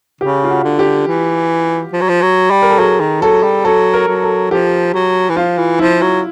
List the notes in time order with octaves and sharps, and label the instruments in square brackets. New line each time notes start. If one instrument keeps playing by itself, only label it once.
[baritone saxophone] C#3 [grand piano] G4
[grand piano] F4
F#4
[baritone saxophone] D3
[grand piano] G4
[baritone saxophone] E3
F3
F#3
F3
F#3
G3
[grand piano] A#4
A4
[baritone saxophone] F#3 [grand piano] G#4
[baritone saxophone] D#3
[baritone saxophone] F#3 [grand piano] A4
[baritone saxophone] G3
[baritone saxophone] F#3 [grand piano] A4
[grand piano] A#4
[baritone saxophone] F#3
[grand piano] A4
[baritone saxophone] F3 [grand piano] G4
[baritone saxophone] F#3
E3
[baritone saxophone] F3 [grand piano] F4
[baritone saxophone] E3
[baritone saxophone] F3 [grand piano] E4
[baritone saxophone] F#3